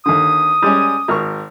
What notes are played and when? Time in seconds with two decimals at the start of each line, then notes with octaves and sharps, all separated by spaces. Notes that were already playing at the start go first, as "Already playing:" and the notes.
0.06 D#2 D3 D#6
0.62 G3 G#3 C#4
1.08 G#1 A#4 C#6